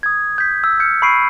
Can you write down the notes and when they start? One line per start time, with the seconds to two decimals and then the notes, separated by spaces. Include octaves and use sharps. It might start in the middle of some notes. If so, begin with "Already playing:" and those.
0.03 D#6 G#6
0.38 G6 B6
0.64 E6
0.80 F6 G6 C#7
1.02 B5 C#6 C7 D7 D#7